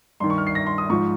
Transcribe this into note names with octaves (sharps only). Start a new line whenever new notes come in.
G2 D#3 C6
C#6
F6
C7
A#6
C6
D#6
G#2 F3 C#6